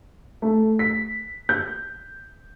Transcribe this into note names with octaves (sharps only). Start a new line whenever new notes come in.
A3
B6
G6